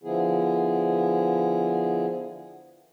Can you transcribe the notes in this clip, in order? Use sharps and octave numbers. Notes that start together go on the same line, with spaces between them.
D3 F3 B3 E4 G#4